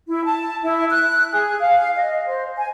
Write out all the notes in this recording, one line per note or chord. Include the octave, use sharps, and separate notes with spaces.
E4
A5
E4
F#6
G#4
F5
D#5
C5
G#5